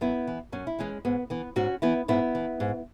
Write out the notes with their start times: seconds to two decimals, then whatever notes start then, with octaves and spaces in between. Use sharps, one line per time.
0.01 F#2 B3 E4
0.27 E3
0.52 F#2 C#4
0.67 E4
0.79 E3 G#3 C#4
1.05 G#2 B3
1.30 E3 B3
1.56 G#2 C#4 F#4
1.82 E3 B3 E4
2.08 G#2 B3 E4
2.35 E3
2.60 G#2